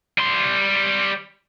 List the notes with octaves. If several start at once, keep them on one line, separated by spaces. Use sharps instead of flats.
G3 C6